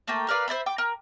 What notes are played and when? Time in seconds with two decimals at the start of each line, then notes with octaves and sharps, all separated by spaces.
0.07 A3 A#3 G5
0.28 A#4 B4 D5 F5
0.48 C5 D5 E5 B5
0.66 G5 D6
0.78 A#4